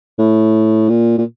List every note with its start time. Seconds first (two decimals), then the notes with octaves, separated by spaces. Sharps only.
0.19 A2
0.89 A#2
1.18 A#2